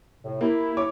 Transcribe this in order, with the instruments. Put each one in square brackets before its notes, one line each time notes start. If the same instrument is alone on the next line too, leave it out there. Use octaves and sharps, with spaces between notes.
[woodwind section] A2 C3
[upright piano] A#3 G4 [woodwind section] E4
[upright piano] C#5 D6